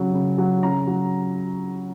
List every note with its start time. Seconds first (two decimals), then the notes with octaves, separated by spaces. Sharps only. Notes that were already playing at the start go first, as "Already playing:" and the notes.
Already playing: C#3 F#3
0.14 C#3
0.38 F#3
0.63 C#3 A#5
0.87 F#3